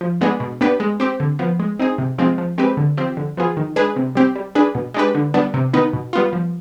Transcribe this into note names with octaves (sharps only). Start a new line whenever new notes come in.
F3
G#3 B3 D4 G#4
B2
B3 D4 G4 B4
G#3
C4 G4
D3
F3 B3
G#3
C4 D#4 G#4
C3
F3 G#3 C4 F4
F3
G#3 C4 G4 B4
D3
F3 C4 G4
D3
F3 B3 F4 G#4
D#3
G#3 D4 G#4 B4
C3
G3 C4 G4
G3
D4 G#4 B4
B2
G#3 D4 G4 B4
D3
G3 B3 D4
C3
D#3 B3 D#4 B4
B2
G3 B3 F4
F3